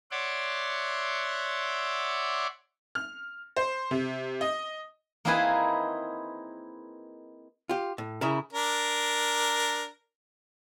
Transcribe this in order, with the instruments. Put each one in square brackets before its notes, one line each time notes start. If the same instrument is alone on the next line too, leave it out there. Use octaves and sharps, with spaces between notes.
[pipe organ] C#5 D5 E5 F#5 C6 D6
[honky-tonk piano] F6
C5
C3
D#5
[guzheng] A#3 C4 D#4 E4 G#4 B4
[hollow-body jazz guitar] F4 G4
A2
C#3 E4 A#4
[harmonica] D4 A#4